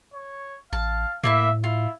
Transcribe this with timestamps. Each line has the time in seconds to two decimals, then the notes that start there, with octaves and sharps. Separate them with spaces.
0.14 C#5
0.73 A1 F5 A5
1.24 A2 A#3 D4 E4 E5
1.64 E4 F4